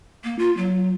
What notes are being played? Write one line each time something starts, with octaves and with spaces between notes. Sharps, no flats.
A#3
F4
F#3